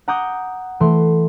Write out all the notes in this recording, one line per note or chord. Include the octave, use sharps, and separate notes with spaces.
F#5 A#5 D6 D#6 F#6 G6
E3 A3 C6